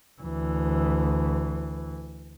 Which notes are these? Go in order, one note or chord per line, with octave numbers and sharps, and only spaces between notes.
D2 E3